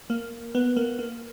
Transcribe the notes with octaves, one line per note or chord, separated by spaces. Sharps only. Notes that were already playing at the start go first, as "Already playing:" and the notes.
A#3
B3
A#3
A#3